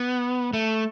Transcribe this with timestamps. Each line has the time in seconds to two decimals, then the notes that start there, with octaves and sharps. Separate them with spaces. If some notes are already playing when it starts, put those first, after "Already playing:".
Already playing: B3
0.53 A3